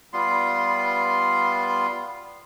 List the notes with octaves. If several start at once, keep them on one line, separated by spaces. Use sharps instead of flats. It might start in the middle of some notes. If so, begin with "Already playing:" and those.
G3 B3 F4 C6